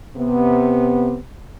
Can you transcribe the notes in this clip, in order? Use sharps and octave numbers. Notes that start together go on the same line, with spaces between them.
C3 B3